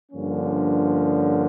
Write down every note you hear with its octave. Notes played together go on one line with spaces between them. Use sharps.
G2 D3 F3 A#3 C#4